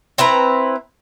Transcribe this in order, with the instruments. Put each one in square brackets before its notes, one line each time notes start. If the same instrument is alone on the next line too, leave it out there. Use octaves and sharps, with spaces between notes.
[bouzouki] C4 E4 B4 A#5